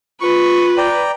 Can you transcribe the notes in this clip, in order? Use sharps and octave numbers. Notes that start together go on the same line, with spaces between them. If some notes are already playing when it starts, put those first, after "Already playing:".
F4 B4 C#6
D5 G5 A#5